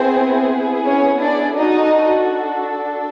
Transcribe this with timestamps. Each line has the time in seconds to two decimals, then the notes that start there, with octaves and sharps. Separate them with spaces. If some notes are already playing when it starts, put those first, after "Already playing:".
Already playing: B3 C4 E4 G#4 C5
0.85 C#4 C#5
1.21 D4 D5
1.56 D4 D#4 F#4 A4 D#5